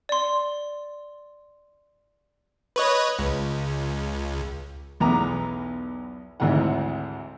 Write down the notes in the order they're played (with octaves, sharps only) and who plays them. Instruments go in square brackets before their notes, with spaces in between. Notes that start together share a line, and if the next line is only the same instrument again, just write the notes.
[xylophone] D5 C6
[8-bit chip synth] B4 C#5 D#5
C#2
[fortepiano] B1 E2 B3 A#5 D6
G#1 D2 G#2 C3 E3 F#5